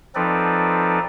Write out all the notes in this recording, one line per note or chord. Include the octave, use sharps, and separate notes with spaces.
F3 C4 D#4 A4 B4 D5